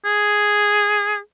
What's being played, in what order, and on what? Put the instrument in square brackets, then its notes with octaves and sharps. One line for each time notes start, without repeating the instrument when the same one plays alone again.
[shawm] G#4